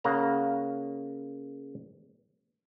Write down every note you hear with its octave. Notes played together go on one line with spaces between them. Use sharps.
C#3 A#3 F#5 A#5